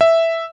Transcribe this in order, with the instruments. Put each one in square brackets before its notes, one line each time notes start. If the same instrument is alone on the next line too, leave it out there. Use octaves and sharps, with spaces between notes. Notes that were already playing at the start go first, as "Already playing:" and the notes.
[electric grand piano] E5